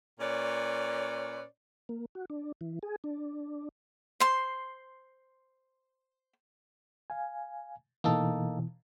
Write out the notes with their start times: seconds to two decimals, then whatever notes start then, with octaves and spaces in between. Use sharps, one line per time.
0.20 A#2 C#4 B4 C#5 D5
1.89 A#3
2.15 F#4
2.30 D4
2.61 E3
2.83 G#4
3.04 D4
4.20 C5 C6
7.10 F5 G#5
8.04 B2 E3 A#3 D#4 A4